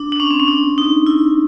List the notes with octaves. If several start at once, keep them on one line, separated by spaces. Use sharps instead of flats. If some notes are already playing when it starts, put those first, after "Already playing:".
Already playing: D4
D4
C#4
C4
C#4
D4
D#4
E4